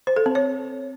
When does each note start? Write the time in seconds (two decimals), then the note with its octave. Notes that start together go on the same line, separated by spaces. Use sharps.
0.07 C5
0.16 A4
0.26 C4
0.35 C#5